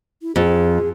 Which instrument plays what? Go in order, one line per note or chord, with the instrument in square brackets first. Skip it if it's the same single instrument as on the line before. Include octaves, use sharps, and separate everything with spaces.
[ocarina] E4
[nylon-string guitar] F2 [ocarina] G#4